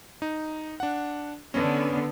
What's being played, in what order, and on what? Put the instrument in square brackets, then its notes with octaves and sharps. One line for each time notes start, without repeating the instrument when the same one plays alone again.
[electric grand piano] D#4
D4 F#5
[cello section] D3 B3 [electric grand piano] C#4